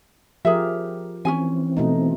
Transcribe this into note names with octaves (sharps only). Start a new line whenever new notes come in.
F3 G4 G#4 A#4 E5
E3 C4 C#4 G#4 G#5
B2 A3 D#4